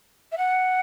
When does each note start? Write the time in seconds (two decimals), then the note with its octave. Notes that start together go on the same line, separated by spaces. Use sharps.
0.32 E5
0.37 F#5